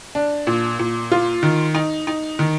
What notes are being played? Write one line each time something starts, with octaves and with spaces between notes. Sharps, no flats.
D4
A#2
A#2
F4
D#3
D#4
D#4
D#3